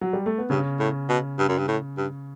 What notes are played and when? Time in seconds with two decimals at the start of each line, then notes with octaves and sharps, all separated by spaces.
0.01 F#3
0.13 G3
0.26 A3
0.38 B3
0.50 G2 C#3 C#4
0.80 A2
1.09 B2
1.39 G2
1.48 F#2
1.58 G2
1.68 A2
1.97 G2